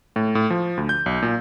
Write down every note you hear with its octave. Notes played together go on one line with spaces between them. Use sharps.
A2
A2
F3
D2
G6
B1
A#2